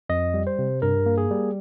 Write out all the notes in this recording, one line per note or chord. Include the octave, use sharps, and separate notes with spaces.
F2 D#5
G3
C5
C3
G2 A#4
A#3
G#4
G3